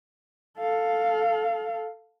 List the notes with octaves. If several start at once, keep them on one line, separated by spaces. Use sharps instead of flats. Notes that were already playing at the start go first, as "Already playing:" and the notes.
A4 F5